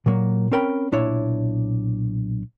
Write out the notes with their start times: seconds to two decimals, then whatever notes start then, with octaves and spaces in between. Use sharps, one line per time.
0.06 A#2 F#3 A#3
0.52 C4 C#4 A#4 G5 B5
0.92 B1 A#2 D4 E4 C#5